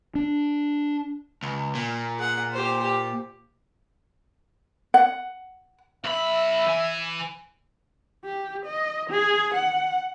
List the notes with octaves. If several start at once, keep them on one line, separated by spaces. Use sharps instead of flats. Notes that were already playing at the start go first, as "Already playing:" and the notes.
D4
C#2
A#2
G#4 F#5
G4 C5
G4
F#5
B1 E5 B5
E3 G#5
G4
D#5
G#4
F#5